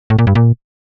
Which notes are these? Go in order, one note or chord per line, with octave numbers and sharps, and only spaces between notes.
A2
A#2
G2
A#2